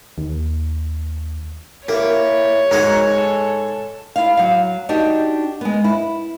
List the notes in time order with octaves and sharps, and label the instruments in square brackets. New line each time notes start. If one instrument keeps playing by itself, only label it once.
[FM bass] D#2
[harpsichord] A#3 [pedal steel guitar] E4 G4 [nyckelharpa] C#5
[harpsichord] G#2 G#3 F#5 [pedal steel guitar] D#4 F#4 A#4
[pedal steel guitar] A4
[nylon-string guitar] E4 F5
F#3 F5
D4 D#4 F#4 G4
G#3 B3
E4